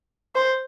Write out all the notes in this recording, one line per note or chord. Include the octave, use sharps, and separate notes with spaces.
C5